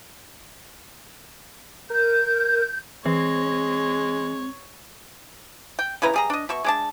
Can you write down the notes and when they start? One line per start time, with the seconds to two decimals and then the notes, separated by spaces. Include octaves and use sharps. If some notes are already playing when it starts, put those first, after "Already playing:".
1.90 A#4 G6
3.06 E3 G#3 C4 C#5
5.79 G5
6.02 C#3 E4 B4 A#5
6.14 G3 G#4 A#5
6.30 D4 D#5
6.49 B2 E5 C#6
6.64 G#3 D4 A5